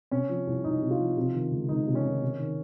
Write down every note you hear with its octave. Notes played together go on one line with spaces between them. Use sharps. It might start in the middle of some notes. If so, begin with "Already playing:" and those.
C3 C#4
F3
C2
C2 D#4
C3
F4
F3
C3
D#3
C#2
C#2 D#4
C3
C#4
D#3
C3
D#3